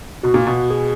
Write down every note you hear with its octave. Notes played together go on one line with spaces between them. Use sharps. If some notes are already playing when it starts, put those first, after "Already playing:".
B2 F#4
A#2
B2
G#4